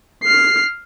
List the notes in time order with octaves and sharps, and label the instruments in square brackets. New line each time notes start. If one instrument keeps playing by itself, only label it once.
[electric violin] F6 C7